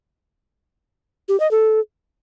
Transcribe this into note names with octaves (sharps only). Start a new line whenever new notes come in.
G4
D#5
A4